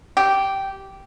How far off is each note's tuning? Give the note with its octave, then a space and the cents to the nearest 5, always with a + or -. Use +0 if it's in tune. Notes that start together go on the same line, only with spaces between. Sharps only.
G4 -10